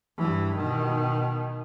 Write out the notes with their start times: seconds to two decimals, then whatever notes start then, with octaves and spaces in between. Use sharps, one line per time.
0.18 G2 E3
0.56 B2 D#3